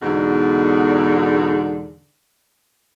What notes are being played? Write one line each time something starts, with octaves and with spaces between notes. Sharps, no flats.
E2 G#2 B2 D3